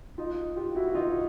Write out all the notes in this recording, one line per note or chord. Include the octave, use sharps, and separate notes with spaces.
D#4 F4
F4 G4
E4 F#4
F#4
D#4 F4